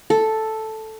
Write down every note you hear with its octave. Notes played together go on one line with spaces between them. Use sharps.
A4